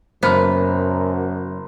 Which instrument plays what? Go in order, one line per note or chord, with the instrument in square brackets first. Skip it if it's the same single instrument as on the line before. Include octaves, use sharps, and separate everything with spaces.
[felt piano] F#1 F6 [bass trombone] F#2 [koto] B3 [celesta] C5